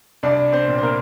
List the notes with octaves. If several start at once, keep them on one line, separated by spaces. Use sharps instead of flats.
C2 D4 D5
C4 C5
A#2
C5
A#3 A#4